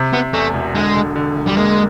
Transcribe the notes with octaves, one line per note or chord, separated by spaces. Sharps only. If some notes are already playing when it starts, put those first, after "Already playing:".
Already playing: C3
C3 B3
E2 A3
E1
D3 G#3
D3
D3
E1
G3
G#3 A#3